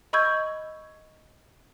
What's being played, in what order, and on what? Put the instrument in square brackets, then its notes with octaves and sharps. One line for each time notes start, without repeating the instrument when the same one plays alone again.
[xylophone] D#5 B5 C#6 E6 G6 G#6